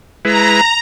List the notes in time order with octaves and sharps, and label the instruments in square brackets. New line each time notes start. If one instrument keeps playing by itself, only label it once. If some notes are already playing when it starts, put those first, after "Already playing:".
[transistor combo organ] G#3 E4 B4 [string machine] A#5